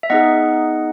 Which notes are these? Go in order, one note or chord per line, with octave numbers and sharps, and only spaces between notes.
E5
B3 D#4 G#4 D#5 F#5